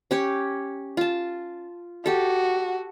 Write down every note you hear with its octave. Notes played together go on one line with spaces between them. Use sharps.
C#4 G4 C#5
F4 A5
F#4 G4 A4